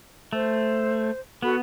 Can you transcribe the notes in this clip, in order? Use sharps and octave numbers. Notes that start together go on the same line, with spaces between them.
A3 C5
B3 F#4 A4 B5